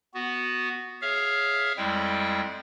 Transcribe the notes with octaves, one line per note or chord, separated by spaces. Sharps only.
B3 F#4
G#4 C#5 E5 F5 F6
F2 G3 G#3 E4 G5